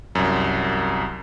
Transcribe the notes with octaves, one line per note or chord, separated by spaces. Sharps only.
C2 F#2